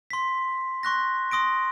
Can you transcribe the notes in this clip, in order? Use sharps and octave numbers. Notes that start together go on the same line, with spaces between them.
C6 B6
C6 C#6 F#6 A#6
C6 D#6 A#6 D7